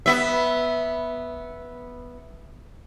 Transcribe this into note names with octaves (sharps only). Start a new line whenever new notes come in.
B3 E5